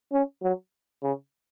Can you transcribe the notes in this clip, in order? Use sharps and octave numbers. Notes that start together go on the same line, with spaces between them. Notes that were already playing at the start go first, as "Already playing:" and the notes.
C#4
F#3
C#3